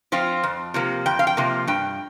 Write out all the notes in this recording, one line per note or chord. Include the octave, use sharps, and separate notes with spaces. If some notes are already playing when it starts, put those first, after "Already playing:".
F3 C4 F4
F2
C3 F3 A#3
F2 G5
F5
G5
C3 F3 A#3
G2 G5